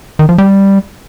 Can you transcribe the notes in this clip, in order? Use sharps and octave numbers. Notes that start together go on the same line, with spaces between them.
D#3
F3
G3